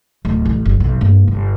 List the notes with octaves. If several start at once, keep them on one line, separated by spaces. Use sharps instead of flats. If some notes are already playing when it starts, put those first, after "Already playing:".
D1
A1
F#1
B1
G2 A#3
G1